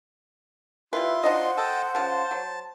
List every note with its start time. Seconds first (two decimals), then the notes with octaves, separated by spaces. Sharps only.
0.93 G3 E4 F4 B4 C6
1.23 D4 D#4 C5 D#5 F#5
1.57 A4 D#5 G5 A5
1.95 C#3 F3 F4 A5
2.31 F#3